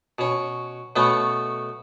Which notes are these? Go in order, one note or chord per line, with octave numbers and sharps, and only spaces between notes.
B2 C#4
B2 A3 B3 C#4